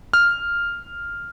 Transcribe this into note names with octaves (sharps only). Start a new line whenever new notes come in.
F6